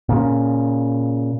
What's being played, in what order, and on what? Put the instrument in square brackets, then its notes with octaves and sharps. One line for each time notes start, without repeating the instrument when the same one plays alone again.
[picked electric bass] A#2 C#3